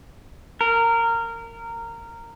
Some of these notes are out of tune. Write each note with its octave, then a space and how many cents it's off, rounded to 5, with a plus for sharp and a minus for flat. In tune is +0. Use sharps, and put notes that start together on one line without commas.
A#4 -15